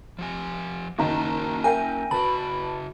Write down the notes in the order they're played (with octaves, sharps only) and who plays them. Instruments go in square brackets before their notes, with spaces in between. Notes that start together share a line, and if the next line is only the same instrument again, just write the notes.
[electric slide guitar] F3 G4 G#5
[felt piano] F#1 D#3 A#5 [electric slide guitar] A#3 C#4 A5
[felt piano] A#4 E5 G5 [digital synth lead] G#5
[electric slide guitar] C#3 F#4 [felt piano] B4 A5 [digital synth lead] B5